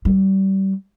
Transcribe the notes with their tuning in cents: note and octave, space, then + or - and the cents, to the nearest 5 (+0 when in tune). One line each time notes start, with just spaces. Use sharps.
G3 -30